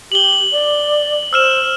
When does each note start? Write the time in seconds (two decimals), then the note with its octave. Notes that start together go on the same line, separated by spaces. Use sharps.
0.12 G4 F#7 G7
0.52 D5
1.33 C5 E6 F6 E7